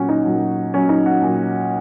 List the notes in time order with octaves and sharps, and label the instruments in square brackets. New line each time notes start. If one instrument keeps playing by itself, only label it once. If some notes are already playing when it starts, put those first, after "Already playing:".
Already playing: [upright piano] A#2 F#3 C#4 F#4
D#4
A#2 F#3
A#2 F#3 C#4
D#4
F#4
A#2 F#3